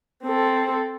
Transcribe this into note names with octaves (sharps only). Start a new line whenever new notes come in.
C4 A4